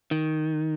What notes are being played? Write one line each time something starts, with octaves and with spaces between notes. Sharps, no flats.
D#3